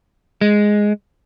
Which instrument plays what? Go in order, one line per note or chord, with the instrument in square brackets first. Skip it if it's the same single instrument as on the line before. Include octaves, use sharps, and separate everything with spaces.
[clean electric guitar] G#3